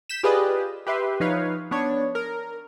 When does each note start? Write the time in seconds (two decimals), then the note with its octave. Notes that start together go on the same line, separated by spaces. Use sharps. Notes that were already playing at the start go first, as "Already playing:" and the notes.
0.09 G6 B6 E7
0.23 F4 G4 G#4 B4 D5 D#5
0.87 G4 B4 E5 C6
1.20 F3 D#4 B4 C#5 F5
1.71 B3 D4 C#5
2.15 A#4